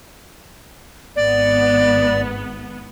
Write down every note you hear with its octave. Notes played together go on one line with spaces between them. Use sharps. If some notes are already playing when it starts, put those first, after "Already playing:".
G#1 B3 D5